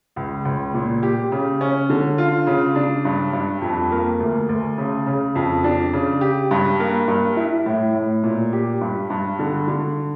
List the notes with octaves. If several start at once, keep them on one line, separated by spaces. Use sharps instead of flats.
C#2
C#2
A#2
G4
C#3
C#4
D3
F4
C#3
D4
G2
G2
F2
A#3
D2
D2
C#3
C#3
F2
D4
C#3
G4
G2
A#3
G2
E4
A2
A2
A#2
G4
G2
G2
D3
D3